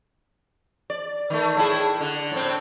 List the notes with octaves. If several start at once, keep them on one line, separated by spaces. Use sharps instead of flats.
D5
D#3 A3
A2 E4 G#4
D3
A2 C4